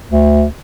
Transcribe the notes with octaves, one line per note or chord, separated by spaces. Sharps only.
D2